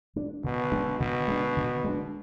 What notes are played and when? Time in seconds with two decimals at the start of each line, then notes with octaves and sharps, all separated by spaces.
0.16 G#3 D4
0.44 B2 D3
0.72 G#3 D4
0.99 B2 D3
1.28 G#3 D4
1.57 D3
1.84 G#3 D4